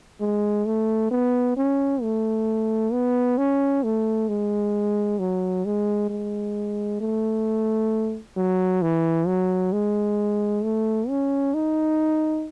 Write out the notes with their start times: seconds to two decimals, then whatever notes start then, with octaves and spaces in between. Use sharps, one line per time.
0.21 G#3
0.66 A3
1.11 B3
1.57 C#4
2.02 A3
2.93 B3
3.38 C#4
3.83 A3
4.29 G#3
5.19 F#3
5.65 G#3
6.10 G#3
7.01 A3
8.37 F#3
8.82 E3
9.27 F#3
9.72 G#3
10.64 A3
11.09 C#4
11.54 D#4